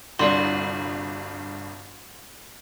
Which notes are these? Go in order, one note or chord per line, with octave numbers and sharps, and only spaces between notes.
G1 C2 G2 F4 F#4 D5 C6